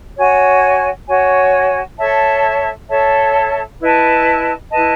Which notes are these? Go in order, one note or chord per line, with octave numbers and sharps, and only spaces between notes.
F#4 C#5 G#5
F#4 C#5 G#5
A4 C#5 E5 A5
A4 C#5 E5 A5
E4 B4 D#5 A5
E4 B4 D#5 A5